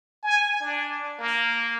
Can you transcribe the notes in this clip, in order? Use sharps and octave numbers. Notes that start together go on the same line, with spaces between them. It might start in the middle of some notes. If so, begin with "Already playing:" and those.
G#5
D4
A#3